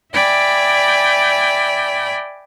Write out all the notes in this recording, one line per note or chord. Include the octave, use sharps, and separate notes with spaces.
D5 E5 G5 G#5 B5